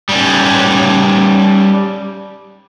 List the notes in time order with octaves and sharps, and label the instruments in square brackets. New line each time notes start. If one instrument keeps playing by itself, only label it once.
[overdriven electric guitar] G3 C#4